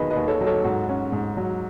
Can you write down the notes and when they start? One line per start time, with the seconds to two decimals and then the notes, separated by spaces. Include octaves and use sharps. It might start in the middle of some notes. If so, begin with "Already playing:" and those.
Already playing: D#2 D#3 F#3 B3 G#4 B4 D#5
0.10 B4 D#5
0.16 D#2
0.28 A4 C#5
0.41 F#3
0.46 A4 C#5
0.64 G#2 F#4
0.89 C#4
1.12 G#2
1.37 F#3